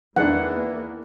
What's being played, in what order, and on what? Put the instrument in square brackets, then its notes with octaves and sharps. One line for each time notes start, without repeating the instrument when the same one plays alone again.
[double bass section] E2 A#3 B3 [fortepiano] D#3 G#3 D4 [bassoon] E3 [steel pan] F#5